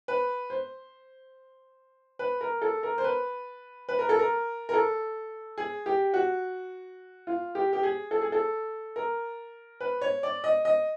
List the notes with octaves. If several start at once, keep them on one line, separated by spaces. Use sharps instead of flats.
B4
C5
B4
A#4
A4
A#4
C5
B4
B4
A#4
A4
A#4
A#4
A4
G#4
G4
F#4
F4
G4
G4
G#4
A4
G#4
A4
A#4
B4
C#5
D5
D#5
D#5